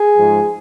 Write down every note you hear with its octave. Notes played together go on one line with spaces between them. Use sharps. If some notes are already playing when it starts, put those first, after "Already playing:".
Already playing: G#4
G#2 F3